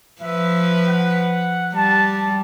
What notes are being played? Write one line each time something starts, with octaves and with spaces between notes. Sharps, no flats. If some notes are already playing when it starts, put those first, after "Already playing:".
F3 B4 E5
F#5
G3 A5